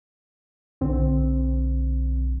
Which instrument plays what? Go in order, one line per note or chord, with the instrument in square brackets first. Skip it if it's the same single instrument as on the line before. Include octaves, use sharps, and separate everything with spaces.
[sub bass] B1 [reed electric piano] D3 C4